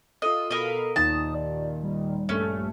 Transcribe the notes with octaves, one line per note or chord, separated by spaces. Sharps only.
F4 A4 D#5 E6
B2 A#4 D#5 F5 B5
D#2 A#2 D#3 A5 D#6
D5
G3
A#1 G2 A3 C#4